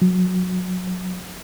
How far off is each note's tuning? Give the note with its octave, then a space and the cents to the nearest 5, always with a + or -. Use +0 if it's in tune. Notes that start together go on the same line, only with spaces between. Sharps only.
F#3 -20